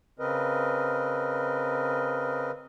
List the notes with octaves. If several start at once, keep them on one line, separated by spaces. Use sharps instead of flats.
C#3 C4 A#4 B4 D#5